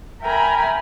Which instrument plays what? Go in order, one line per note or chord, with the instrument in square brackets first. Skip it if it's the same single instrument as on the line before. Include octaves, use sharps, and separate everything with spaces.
[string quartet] A#4 E5 G5 G#5 A#5 B5